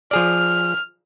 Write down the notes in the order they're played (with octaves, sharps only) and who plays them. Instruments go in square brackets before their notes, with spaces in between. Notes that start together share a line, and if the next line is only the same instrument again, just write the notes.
[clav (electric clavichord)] F3 G#4 D5 [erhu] F6